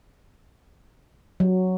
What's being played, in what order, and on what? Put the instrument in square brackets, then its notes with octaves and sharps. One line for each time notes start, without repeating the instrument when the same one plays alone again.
[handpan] F#3